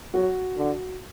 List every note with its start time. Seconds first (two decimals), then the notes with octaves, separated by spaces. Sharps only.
0.14 F#3 F#4
0.57 D3